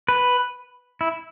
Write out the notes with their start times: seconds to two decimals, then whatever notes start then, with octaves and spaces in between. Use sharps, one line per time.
0.08 B4
1.01 E4